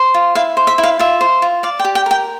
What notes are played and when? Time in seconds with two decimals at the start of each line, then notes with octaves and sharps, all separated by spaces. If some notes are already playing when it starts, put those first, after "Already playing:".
Already playing: C5
0.14 F4
0.35 E4 F5
0.57 C5
0.67 E5
0.78 E4
0.83 F5
0.99 F4 E5
1.21 C5
1.42 F4
1.63 D5 F5
1.79 G5
1.85 G4
1.95 G5
2.06 A#4 G5